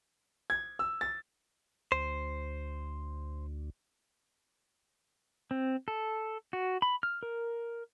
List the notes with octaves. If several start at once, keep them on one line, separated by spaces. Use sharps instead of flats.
G#6
E6
A6
D2 C5
C4
A4
F#4
B5
F6
A#4